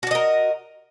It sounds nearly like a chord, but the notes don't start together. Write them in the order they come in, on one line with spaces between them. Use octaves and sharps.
F#4 D4 D#5 A#4